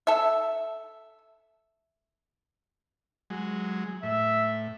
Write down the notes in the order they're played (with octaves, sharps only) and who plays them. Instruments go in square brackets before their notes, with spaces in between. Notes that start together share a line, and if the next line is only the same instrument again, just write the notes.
[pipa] A4 E5
[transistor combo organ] F#3 G#3
[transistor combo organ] A2 [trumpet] E5